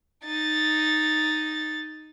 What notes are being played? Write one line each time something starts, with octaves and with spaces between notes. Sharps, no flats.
D#4 A6